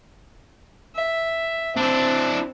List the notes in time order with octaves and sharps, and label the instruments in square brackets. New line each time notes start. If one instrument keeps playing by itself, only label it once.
[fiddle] E5
[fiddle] C4 [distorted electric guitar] D4 E4